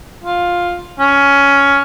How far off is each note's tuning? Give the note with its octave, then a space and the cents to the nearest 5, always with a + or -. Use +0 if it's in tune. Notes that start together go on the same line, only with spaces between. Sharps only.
F4 +10
C#4 +10